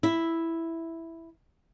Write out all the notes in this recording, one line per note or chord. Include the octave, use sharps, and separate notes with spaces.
E4 E5